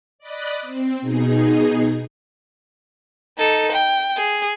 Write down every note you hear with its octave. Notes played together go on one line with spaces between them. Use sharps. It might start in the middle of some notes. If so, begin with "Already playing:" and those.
D5 D#5 B5 F#6
C4
B2 D#4 G#4
D#4 A4
G5
G#4